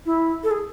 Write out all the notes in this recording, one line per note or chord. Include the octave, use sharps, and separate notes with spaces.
E4
A4
G#4